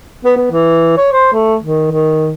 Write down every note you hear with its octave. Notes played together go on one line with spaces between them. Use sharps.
B3
B3
E3
C#5
C5
A3
D#3
D#3